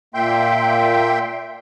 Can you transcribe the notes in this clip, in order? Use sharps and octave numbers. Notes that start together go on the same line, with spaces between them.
A#2 A#3 E5 G5 C6 G6